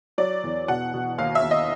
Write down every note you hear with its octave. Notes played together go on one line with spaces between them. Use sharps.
F#3 D5
E2
B2 F#5
B2
D#2 F5
E5
D#2
D#5